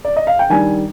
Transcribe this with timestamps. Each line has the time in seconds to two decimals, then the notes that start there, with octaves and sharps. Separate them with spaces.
0.05 D5
0.16 D#5
0.27 F5
0.39 G5
0.50 D#3 G3 D4 G#5